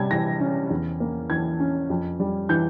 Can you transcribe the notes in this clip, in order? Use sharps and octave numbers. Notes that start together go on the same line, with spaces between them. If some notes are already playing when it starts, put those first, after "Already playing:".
Already playing: C3 G3 G#6
E3 A#6
C#4
E2
A#3
E3 G#6
C#4
F2
G3
E3 G6